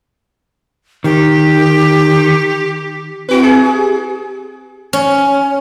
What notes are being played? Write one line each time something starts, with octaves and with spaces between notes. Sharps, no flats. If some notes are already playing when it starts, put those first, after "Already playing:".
D#3 G4
C4 E4 F#4 B4
G#4
G4
C#4